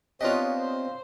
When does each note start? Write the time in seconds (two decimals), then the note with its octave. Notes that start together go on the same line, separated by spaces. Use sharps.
0.21 B3 C4 D4 F4 G4 C#5 D#5
0.57 C5